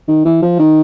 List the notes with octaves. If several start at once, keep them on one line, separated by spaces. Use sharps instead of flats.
D#3
E3
F3
D#3